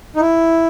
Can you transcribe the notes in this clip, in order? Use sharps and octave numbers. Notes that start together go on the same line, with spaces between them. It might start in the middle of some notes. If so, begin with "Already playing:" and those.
D#4
E4